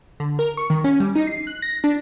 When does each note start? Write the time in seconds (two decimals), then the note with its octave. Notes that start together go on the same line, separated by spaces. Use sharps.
0.20 D3
0.39 A#4
0.57 C#6
0.70 D#3
0.84 C#4
1.00 G3
1.16 D#4
1.27 C7
1.47 F#6
1.62 A#6
1.84 D4